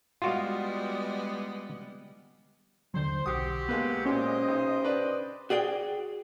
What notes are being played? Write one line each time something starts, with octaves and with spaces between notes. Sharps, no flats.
G3 G#3 B3 F4 F#4 F5
D#2 D3 F#3 C5
B1 C4 F#4 G4 D#6
G#3 A#3 B3 B4
A#2 G#3 C#4 G4 C5 D#5
B1
D4 B4 D5
F#4 G#4 D5 G5